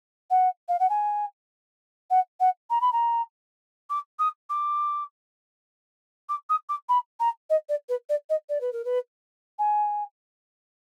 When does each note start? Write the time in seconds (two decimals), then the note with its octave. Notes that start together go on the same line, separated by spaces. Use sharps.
0.30 F#5
0.69 F5
0.80 F#5
0.89 G#5
2.10 F#5
2.40 F#5
2.70 A#5
2.81 B5
2.93 A#5
3.90 D6
4.19 D#6
4.50 D6
6.29 D6
6.50 D#6
6.69 D6
6.89 B5
7.20 A#5
7.50 D#5
7.69 D5
7.89 B4
8.09 D5
8.30 D#5
8.49 D5
8.61 B4
8.73 A#4
8.85 B4
9.59 G#5